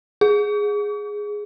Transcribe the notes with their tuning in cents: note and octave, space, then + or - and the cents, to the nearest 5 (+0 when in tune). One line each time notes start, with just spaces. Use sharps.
G#4 +0